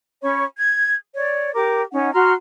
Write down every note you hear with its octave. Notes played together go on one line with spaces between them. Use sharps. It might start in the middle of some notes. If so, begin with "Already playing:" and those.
C#4 C#5 B5 C#6
G#6
C#5 D5
G4 A#4 D6
C#4 D#4 F#5
F#4 A#5 C6 F6